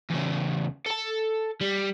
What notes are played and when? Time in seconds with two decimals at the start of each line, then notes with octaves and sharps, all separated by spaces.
0.10 E2 C#3
0.86 A4 A5
1.61 G3